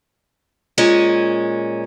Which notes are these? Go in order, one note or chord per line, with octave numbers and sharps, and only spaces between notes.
A#2 G#3 C#4